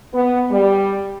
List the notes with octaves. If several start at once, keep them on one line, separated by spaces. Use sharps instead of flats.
B3
G3